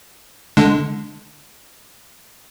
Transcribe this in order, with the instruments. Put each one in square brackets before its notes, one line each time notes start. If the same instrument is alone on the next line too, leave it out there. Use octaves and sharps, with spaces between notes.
[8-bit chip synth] D3 G#3 D4